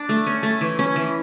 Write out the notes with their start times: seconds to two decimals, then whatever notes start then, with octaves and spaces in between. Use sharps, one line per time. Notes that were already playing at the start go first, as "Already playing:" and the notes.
Already playing: D4
0.09 A3
0.27 C#4
0.43 A3
0.61 E3
0.79 C#4
0.96 E3